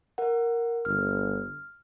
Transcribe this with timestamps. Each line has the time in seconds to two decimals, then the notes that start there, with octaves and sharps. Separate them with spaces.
0.18 A#4 F#5
0.85 G1 F6